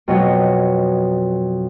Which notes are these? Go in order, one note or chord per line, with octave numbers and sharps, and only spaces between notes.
F2 B2 F#3